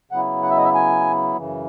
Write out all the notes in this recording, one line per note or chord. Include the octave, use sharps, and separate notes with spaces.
C#3 F#3 B3 E4 F#5
F#5
E5
D#5
E5
G#5
F#2 C#3 E3